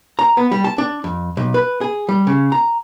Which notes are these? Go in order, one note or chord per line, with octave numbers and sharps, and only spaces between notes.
A#5
B3
G3
A5
D4
F2
B1
B4
G#4
G3
C#3
A#5